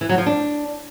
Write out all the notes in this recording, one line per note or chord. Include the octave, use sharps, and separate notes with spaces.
E3
F#3
F3
D4